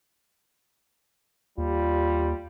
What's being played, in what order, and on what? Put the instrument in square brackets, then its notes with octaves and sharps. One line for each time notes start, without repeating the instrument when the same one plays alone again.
[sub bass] D#2 [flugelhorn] G3 [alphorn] F4